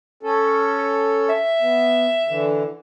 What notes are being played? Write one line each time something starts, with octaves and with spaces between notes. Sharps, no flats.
C#4 A4
E5
B3
D3 E3